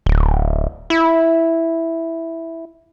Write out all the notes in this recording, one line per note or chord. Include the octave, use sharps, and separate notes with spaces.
D1
E4